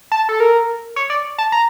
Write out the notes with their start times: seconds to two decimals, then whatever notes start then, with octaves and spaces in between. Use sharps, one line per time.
0.12 A5
0.29 A4
0.40 A#4
0.96 C#5
1.10 D5
1.38 A5
1.52 A#5